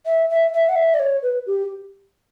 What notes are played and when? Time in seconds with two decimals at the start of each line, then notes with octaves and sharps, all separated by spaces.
0.06 E5
0.30 E5
0.54 E5
0.69 F#5
0.76 E5
0.94 D5
1.00 C#5
1.23 B4
1.47 G4